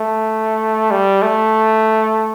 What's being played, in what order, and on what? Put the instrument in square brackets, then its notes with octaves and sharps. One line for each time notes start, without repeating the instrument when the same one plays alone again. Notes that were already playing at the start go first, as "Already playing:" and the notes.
Already playing: [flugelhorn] A3
G3
A3